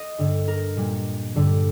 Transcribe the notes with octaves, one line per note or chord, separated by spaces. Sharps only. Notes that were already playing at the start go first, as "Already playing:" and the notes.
Already playing: D#5
G2 D3 G3
A#4
A#2 G3
G2 D3 G3